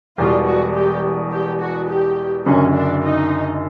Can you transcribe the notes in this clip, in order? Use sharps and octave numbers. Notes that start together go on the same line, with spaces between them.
E1 E2 B2 G3 F4
F#4
G4
G4
F#4
G4
F#1 F#2 D3 C#4
D4
D#4